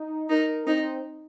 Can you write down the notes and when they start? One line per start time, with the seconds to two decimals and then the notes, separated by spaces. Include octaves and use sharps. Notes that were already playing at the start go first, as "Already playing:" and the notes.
Already playing: D#4
0.29 D#4 A#4
0.67 C4 D#4